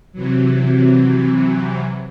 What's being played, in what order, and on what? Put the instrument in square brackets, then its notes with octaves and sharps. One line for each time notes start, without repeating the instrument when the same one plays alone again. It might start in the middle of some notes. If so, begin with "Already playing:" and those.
[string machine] C3 E3 F#3